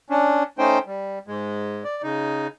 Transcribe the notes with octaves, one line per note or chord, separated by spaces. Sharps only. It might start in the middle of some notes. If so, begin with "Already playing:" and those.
C#4 D4
A3 C#4 D#4 C5 G5
G3
G#2 G#3
D5
C#3 D#4